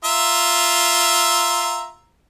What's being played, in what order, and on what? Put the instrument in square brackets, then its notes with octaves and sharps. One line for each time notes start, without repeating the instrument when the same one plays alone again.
[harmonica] F4 E5 A#5